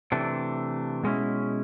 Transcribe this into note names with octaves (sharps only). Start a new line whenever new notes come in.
C3 E3 A3 D4
B2 G#3 C#4 E4